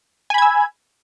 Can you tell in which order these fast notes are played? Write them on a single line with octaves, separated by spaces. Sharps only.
G#5 B5 G#6 E6